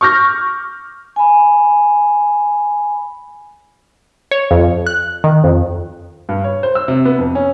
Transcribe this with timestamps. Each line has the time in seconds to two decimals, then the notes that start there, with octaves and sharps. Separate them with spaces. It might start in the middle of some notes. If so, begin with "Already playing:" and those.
0.01 C#6 D6 F6 G6 A#6
1.16 G#5 B5
4.31 C#5
4.51 F2
4.86 F#6
5.24 D#3
5.44 F2
6.29 G2
6.44 C#5
6.63 C5
6.75 E6
6.88 C3
7.05 B3
7.18 F2
7.35 C#4